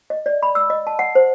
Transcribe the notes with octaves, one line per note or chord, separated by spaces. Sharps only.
D#5
D5
B5
E6
D#5
A5
F#5
C5